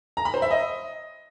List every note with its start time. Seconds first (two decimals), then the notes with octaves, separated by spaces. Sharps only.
0.17 A#5
0.25 B5
0.34 C5
0.42 E5
0.51 D#5